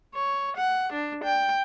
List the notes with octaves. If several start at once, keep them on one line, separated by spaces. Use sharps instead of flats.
C#5
F#5
D4
G5